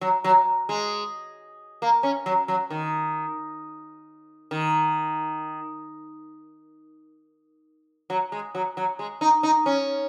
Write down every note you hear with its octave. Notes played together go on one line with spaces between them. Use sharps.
F#3
F#3
G#3
A#3
C#4
F#3
F#3
D#3
D#3
F#3
G#3
F#3
F#3
G#3
D#4
D#4
C#4